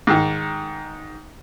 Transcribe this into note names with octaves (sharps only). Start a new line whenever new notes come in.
G#2 D#3